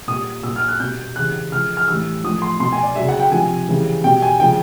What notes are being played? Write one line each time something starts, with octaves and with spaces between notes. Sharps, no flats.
A#2 G3 D#6
A#2 F#3 E6
F6
F#6
B2 G3 G6
C#3 E3 G3 F#6
C#3 F3 F6
F6
A2 E3 G3 E6
A2 F3 D#6
C6
B2 F#3 C6
G#5
D5
C#3 F#3 E5
F#5
G5
C3 F3 G#5
C#3 E3 G3
B2 G3 G5
G#5
C#3 F3 G5